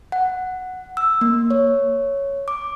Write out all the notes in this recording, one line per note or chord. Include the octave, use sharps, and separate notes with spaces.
F#5
E6
A#3
C#5
D6